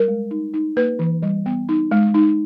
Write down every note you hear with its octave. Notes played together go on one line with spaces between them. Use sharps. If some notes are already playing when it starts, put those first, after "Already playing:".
Already playing: G3 A#4
G#3
D#4
D#4
A#3 B4
E3
G3
B3
D#4
G#3
D#4